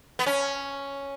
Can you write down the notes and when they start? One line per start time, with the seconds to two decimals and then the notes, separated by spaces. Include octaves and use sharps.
0.19 B3
0.26 C#4